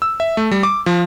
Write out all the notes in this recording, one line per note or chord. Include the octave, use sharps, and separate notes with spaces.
E6
E5
A3
G3
D6
F3